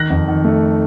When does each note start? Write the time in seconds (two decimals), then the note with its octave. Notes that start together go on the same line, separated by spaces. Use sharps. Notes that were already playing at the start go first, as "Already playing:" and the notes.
Already playing: D#3 F#6 A#6
0.10 F2
0.28 D#3
0.45 A3